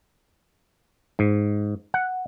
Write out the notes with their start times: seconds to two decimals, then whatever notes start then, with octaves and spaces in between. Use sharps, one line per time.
1.19 G#2
1.94 F#5